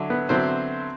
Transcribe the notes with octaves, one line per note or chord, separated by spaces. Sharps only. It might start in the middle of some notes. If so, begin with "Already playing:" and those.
Already playing: D3 F#3 E4
B3 B4
D3 F#3 B3 C4 E4 C5